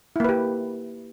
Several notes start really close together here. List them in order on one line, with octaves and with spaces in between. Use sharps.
E4 A#3 B4 G4